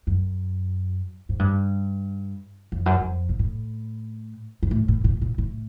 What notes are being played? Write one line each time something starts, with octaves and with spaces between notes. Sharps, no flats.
F#2
G#2
G2
F2
F#2
F2
A#2
A2
G#2
A2
A2
A#2
A#2
A2